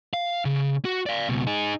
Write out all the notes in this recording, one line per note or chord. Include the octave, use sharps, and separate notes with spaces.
F5
C#3
F#4
D5 F5
C#2 B2
D#4 G#4